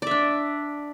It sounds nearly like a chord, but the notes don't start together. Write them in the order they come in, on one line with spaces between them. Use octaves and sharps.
D5 E5 D4